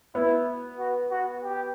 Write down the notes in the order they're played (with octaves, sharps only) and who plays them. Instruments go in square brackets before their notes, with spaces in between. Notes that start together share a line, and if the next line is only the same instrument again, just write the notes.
[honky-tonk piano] B3 [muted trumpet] E4
[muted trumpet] F#4
F#4
G4